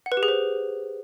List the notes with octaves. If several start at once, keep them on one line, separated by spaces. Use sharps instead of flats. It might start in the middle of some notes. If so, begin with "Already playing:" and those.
F#5
B4
G4
G#4
C5